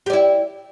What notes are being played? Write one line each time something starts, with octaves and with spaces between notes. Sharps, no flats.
E4 G4 D5